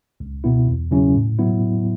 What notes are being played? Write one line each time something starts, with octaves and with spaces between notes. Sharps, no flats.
C#2
B2 B3 E4
E2
C#3 F#3 C#4 E4
A2
F#3 B3 E4